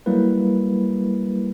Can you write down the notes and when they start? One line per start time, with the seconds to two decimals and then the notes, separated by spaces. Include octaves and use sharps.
0.06 F#3 G3 A#3 E4 B4